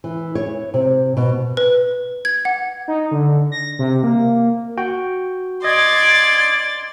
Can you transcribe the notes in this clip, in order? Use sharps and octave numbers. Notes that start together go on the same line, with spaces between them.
E3
C#5
C3
B2
B4
G#6
F#5
D#4
D3
A#6
C3
A#3
F#4 G5
D5 D#5 C6 G#6 A6